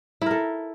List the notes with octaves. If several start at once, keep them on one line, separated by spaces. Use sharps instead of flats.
E4 A4 A#4